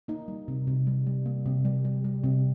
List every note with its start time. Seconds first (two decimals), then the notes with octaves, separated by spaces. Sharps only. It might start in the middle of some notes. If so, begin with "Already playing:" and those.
0.08 A#3 D#4
0.28 G3
0.48 C3
0.67 C3
0.87 G3
1.07 G3
1.26 A#3
1.46 C3
1.65 G3
1.85 G3
2.04 G3
2.24 C3